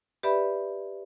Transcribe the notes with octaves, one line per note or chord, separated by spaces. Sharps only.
G4 B4 D5 E5 B5